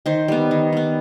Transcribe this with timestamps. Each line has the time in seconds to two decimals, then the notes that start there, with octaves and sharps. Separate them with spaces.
0.06 D#3 C5
0.28 G3 B3
0.51 D#3
0.72 G3 B3